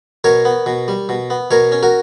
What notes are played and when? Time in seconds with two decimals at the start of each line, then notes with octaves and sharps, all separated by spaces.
0.24 B2 A#4 C#5
0.45 B3
0.66 B2
0.88 G3
1.09 B2
1.30 B3
1.51 B2 A#4 C#5
1.72 C#4
1.83 F#4 A#4